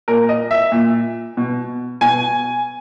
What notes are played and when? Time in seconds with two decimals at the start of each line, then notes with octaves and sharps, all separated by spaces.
0.08 A#2 A#4
0.29 D#5
0.51 E5
0.72 A#2
1.37 B2
2.01 B2 G#5